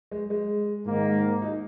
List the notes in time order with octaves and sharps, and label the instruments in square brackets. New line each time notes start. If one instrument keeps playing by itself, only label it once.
[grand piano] G#3
G#3
[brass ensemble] G#2 D#3 A#3
[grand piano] D#4